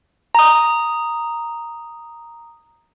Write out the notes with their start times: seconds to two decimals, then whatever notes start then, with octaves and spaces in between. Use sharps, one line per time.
0.35 A#5 D#6